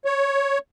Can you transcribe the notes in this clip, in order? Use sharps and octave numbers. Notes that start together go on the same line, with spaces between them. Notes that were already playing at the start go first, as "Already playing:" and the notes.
C#5